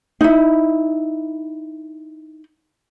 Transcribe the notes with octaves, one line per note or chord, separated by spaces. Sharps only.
D#4 E4